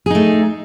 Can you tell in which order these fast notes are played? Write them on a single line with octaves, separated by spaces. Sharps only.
G#4 D#4 A3